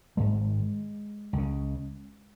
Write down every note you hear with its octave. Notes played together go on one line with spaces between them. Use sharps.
G#1 G#2 G#3
C#2 C#3